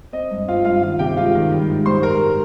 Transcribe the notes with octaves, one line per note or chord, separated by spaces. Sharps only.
C4 D#5
G2
C4 F4 F5
G2 F4 F5
D#3 F4 F5
C3 G4 G5
G#3 F4 F5
D#3
G3
G#2
G3 C5 C6
G#2 A#4 A#5